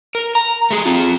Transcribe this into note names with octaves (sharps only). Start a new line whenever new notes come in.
A#4
A#5
A3 G#4
C4 F4